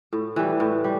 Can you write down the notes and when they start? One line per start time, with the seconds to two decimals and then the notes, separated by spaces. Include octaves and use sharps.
0.13 A2
0.36 E3 G3
0.60 A2
0.84 G3